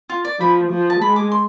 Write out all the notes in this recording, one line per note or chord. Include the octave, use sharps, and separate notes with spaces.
F4
D5
F3 B5
F3
A5
G#3 B5
D6
C6